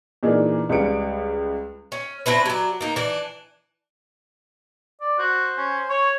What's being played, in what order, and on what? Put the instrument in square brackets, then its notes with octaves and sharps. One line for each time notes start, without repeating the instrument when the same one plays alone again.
[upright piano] A#2 E3 D4 D#4 G#4 A#4
C#2 G3 B4 F5 C#7 D7
[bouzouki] C#4
C4 D4 E4 B4
F#3 D4
A#3 D#4
E3 D4
[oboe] D5
[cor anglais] F#4 [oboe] C5
[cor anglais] C#4
[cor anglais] C#5 [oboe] C#6